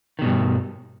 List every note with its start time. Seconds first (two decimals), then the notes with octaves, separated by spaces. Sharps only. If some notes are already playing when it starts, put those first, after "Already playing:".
0.19 D#3
0.22 B2
0.25 G2